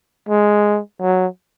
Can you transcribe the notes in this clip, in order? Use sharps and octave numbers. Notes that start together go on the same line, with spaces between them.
G#3
F#3